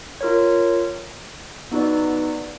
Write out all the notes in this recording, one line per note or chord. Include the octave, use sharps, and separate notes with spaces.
F4 A#4 C#5
B3 D#4 F#4 B4 D5